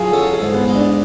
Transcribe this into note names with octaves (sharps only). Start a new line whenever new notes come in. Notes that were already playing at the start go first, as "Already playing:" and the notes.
Already playing: F#3 F4 G#4
C#4 A4
A4
G#2
B3
G#3
D4